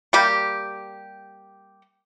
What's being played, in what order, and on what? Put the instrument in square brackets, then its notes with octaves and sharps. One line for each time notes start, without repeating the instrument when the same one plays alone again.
[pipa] G3 A#3 G4